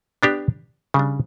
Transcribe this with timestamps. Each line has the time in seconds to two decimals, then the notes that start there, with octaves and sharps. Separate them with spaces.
0.23 B3 D4 G4
0.94 C#3 G3 D4